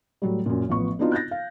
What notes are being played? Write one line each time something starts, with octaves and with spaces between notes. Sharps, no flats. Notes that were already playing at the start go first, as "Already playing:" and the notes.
A2 F#3 G3
F#2 A#2
A1 F3 B3 C#6
B3 C4 D4 D#4 F4 F#4
F#6 G6 A6 A#6
F5